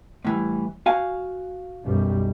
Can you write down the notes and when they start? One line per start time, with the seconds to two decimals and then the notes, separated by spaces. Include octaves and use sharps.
0.25 A2 E3 G3
0.86 F#4 F5 G#5
1.83 B1 F#2 G3